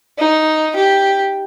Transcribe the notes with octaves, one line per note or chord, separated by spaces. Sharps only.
D#4
G4